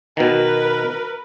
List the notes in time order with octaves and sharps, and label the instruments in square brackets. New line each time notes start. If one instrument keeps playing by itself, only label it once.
[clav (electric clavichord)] B2 D#3 [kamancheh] A#4 B4